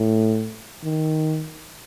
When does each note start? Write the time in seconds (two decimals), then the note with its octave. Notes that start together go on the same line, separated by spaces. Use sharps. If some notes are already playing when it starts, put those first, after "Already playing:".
Already playing: A2
0.84 D#3